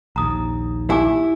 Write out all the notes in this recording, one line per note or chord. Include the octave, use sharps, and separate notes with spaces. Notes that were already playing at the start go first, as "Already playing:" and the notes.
A#1 D#2 A#5 D#6
E4 G4 G#5 D6